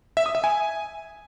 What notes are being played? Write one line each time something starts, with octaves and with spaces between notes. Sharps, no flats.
E5
D#6
E5
G#5